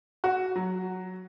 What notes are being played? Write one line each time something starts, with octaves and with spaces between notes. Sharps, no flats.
F#4
F#3